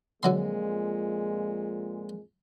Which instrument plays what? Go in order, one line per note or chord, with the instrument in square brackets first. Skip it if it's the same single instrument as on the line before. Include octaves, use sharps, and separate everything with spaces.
[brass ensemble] F2 A#2 G#3 [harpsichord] D3 F#3 C6